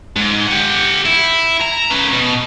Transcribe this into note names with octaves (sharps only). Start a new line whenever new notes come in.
G#2
G4 F#5
E4
A#5
C#4 B4
B2